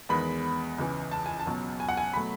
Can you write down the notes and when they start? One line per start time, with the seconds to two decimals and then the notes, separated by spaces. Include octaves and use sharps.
0.09 E2 D#3 G#3 B3 B5
0.78 C#2 C#3 E3
1.11 A5
1.26 G#5
1.40 A5
1.46 C#2 B2 F#3
1.80 G#5
1.88 F#5
1.97 G#5
2.14 B2 F#3 A3 B5